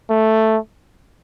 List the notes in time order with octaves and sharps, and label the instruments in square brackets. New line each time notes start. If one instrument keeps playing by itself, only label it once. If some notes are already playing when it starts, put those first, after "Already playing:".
[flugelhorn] A3